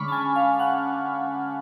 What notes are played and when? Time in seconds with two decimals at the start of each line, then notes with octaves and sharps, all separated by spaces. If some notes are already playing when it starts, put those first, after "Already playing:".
Already playing: D3 G#3 C#4 B5 C#6 D6 F6
0.08 A5
0.12 G#5
0.36 F5
0.53 F5
0.59 F#5